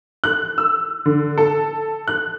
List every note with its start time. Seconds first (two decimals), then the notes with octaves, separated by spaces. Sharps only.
0.24 F#6
0.58 E6
1.06 D3
1.38 A4
2.08 F#6